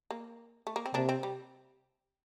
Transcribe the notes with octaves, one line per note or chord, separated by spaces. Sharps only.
A#3
A3
A#3
C4
C3 A#3 D4
C4
G3